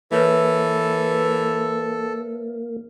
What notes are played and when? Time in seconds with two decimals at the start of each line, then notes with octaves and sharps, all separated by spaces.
0.12 E3 A#3 A4 B4 C#5 E5